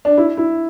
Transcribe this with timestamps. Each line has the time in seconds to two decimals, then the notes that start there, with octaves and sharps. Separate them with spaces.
0.05 D4
0.17 E4
0.37 E4